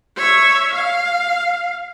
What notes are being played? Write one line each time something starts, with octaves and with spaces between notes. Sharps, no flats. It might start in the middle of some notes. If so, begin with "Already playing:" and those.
C#5 E5
F5